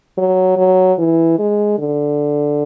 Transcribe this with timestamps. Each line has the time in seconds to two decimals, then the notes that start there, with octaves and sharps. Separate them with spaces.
0.17 F#3
0.57 F#3
0.98 E3
1.38 G#3
1.78 D3